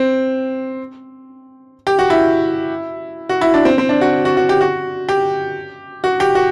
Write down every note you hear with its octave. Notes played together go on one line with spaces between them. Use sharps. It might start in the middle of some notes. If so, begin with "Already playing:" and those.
Already playing: C4
G4
F#4
E4
F#4
E4
D4
C4
C4
D4
F#4
F#4
F#4
G4
F#4
G4
F#4
G4
F#4